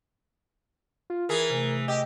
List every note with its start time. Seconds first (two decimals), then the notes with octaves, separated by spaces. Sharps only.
1.10 F4
1.29 E3 G#4 A#4
1.50 C3 A3
1.88 G4 D#5